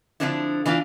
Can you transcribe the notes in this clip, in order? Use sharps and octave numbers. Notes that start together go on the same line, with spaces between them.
D3 F3 B3 C4 D4 E4
E3 B3 D4 F4